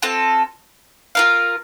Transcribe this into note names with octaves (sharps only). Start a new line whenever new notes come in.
C4 F4 A4
F4 A#4 F5